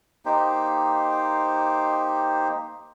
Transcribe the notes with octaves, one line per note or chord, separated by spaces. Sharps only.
A#3 D#4 G4 C5